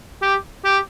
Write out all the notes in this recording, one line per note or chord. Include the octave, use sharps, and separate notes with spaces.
G4
G4